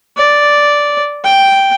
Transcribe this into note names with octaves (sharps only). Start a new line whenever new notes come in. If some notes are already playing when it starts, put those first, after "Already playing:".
D5
G5